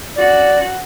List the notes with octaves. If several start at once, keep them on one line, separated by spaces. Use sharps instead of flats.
C#4 F#4 D5